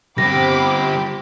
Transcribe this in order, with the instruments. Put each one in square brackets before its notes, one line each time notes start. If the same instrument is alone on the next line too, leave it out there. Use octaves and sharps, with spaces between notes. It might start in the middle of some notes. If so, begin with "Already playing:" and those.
[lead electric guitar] D3 G3 [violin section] C4 B5 D6 [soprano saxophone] G4 [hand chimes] A#6